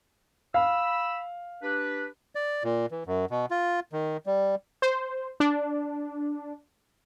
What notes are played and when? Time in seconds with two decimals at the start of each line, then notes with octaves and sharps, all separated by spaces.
0.54 F5 B5 E6
1.62 D4 G4 B4
2.35 D5
2.64 A#2
2.91 E3
3.06 F#2
3.30 B2
3.51 F4
3.92 D#3
4.26 G3
4.82 C5
5.40 D4